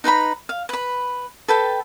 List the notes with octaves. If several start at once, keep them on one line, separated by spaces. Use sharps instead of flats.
D#4 B4 A#5 B5
F5
B4 B5
A4 B4 G5 A5